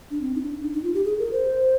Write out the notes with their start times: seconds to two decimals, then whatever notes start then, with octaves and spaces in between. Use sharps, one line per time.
0.11 D4
0.22 C4
0.35 D#4
0.42 D4
0.63 D#4
0.74 D#4
0.83 F4
0.94 G4
1.05 G#4
1.19 A#4
1.32 C5